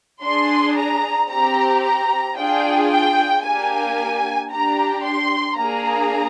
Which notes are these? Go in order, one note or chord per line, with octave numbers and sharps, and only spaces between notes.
D4 G#4 C6
A#5
C4 G4 A#5
A#5
D4 F4 G#4 G5
G5
A#3 D4 G4 G#5
D4 G4 A#5
C6
A#3 D4 G#4 A#5